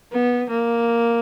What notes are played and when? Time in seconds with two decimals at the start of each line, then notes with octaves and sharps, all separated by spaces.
0.12 B3
0.50 A#3